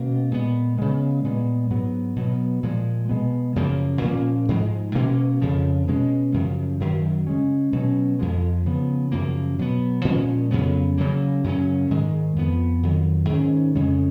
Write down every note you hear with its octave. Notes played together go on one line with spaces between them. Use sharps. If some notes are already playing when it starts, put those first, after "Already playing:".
Already playing: B2 A#3 C#4
A#2 G#3 B3
C#3 G#3 B3
A#2 G#3 B3
G#2 F#3 B3
B2 F#3 B3
A#2 F3 G#3
B2 G#3 B3
F#2 C#3 F3 A#3
A#2 F3 A#3 C#4
G#2 F3 G#3
B2 A#3 C#4
F2 C#3 F3
B2 G#3 C#4
F#2 C#3 F3
F#2 D#3 F#3
C#3 G#3 C#4
B2 F#3 C#4
F2 F3 G#3
C#3 F3 B3
F#2 C#3 F3 A#3
B2 F#3 B3
A#2 F3 G#3 C#4
F2 C#3 F#3 B3
C#3 F#3 A#3
F#2 C#3 F#3 C#4
G#2 D#3 G#3
F2 F3 B3
F2 D#3 F#3
G#2 D#3 A#3 C#4
F2 C#3 G#3 C#4